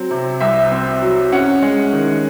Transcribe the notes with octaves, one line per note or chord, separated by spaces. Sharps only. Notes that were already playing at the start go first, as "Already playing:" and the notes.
Already playing: F#3 C4
C3
C2 E5
C4
F#3
C#4 F#5
G#3
D#3